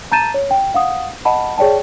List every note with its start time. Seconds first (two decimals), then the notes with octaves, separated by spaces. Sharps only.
0.12 A5 A#5 G6 A6 D#7 E7
0.34 C#5
0.51 G5
0.74 F5 F#5 D#6
1.25 D#5 F#5 A5 B5
1.58 G#4 C#5 D5 G5 A5